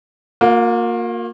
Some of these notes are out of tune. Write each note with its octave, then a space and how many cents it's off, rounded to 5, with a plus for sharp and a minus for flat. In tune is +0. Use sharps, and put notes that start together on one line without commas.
A#3 -5 F4 +45